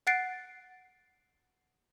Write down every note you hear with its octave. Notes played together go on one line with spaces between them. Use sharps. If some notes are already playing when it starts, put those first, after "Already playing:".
F#5 F#6 A6 C7 D7